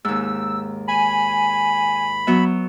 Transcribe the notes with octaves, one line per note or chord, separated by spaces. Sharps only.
D#2 G#2 E6
G#5 B5
F#3 B3 E5